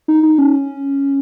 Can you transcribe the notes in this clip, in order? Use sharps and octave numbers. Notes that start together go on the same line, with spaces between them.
D#4
D#4
C#4